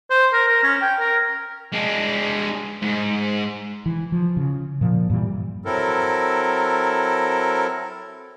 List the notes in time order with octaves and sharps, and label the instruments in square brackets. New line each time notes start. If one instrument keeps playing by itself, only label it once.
[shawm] C5
A#4
A#4
C#4
G5
A#4
[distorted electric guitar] G#3 D4
G#2
[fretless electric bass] E3
F3
C#3
A#2 F3
G2 A#2 E3 G3
[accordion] F#3 C4 E4 A4 A#4